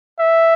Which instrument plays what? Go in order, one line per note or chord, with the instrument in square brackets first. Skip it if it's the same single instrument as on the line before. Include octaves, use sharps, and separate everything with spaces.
[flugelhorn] E5